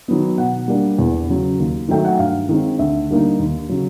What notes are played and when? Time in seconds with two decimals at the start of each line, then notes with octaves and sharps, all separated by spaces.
0.08 D#3 F#3 B3
0.38 B2 F#5
0.68 G3 A#3 D4
0.99 E2
1.29 C#3 F#3
1.59 D#2
1.88 D#3 F#3 A3 G5
2.05 F#5
2.19 G2 F5
2.49 D#3 G#3 C4
2.79 D2 E5
3.09 D3 G3 A#3 D#4
3.39 D#2
3.69 C#3 F#3